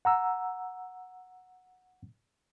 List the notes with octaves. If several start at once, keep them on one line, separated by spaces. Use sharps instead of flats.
F#5 A#5 E6